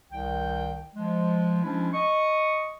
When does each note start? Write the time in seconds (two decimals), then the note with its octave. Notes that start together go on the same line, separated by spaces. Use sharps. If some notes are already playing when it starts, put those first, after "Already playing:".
0.11 C2 D#3 G5
0.94 F3 G#3
1.63 F3 G#3 C#4 D4 E4
1.93 D#5 C#6